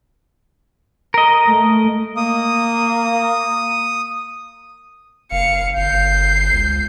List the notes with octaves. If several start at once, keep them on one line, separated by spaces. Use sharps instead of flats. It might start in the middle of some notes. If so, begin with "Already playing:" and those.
A#4 D#5
A3
A#3 D#6
F#1 F5 C#7
G1 G6 C7
C#2